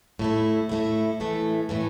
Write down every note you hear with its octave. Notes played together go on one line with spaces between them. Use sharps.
A2 A3 E4
A2 A3 E4
A2 E3 A3
A2 E3 A3